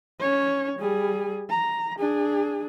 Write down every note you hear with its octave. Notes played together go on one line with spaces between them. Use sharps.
C#4 C#5
G3 G#4
A#5
D4 G#4